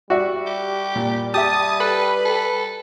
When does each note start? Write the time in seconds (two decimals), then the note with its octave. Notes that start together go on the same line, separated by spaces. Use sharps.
0.10 G3 F#4 D5 E5
0.46 G4
0.95 A#2
1.34 G4 E5 A5 D#6
1.80 A4 B4
2.25 A4